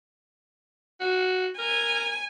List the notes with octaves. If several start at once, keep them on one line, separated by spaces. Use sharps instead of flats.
F#4
A#4 G#5